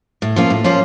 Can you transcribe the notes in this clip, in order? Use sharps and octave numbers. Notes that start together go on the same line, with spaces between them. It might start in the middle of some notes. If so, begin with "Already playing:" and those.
A2
F3 A#3 C#4 F4
A2
F3 A#3 C#4 F4